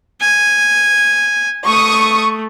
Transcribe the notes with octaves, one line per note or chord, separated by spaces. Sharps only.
G#5
A3 C#6 D#6